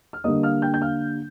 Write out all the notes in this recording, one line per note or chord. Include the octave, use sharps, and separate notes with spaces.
F6
D3 G3 A#3 D#5 D#6
F5 F6
G5 G6
G6
F5 F6